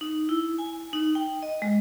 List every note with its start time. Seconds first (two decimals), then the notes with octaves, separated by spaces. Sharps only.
0.01 D#4
0.29 E4
0.58 G#5
0.93 D#4
1.15 G5
1.43 D#5
1.62 G#3